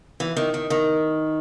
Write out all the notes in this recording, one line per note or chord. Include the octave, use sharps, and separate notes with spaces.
E3
D#3
D#3
D#3